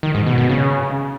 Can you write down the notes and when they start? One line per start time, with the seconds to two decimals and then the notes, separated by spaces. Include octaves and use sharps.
0.03 D#3
0.15 G#2
0.26 B2
0.38 B2
0.49 C#3